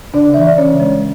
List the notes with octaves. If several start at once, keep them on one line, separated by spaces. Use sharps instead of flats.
C#3 D4 D5
E3 E5
D5
C#3 C#4 C#5
G#3